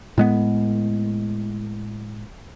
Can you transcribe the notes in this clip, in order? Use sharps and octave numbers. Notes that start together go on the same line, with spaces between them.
A2 G#3 B3